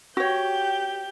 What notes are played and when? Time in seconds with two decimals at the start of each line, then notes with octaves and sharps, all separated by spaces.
0.17 F#4 G4 C#5 G6